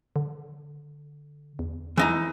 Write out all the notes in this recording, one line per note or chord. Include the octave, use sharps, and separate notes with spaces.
D3
E2
E3 D#4 A#5